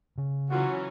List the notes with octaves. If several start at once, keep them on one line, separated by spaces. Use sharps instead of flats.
C#3
E3 F#3 C#4 F4 F#4